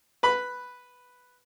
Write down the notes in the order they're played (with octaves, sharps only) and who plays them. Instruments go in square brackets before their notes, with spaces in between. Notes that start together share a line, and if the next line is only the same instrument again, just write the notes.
[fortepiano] B4 B5